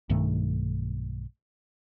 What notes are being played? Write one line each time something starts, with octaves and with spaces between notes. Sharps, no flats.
B1 G2 D#3 A3